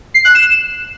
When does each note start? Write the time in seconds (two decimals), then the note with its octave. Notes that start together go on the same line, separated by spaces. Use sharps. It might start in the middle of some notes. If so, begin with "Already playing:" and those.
0.14 C7
0.25 F#6
0.35 E7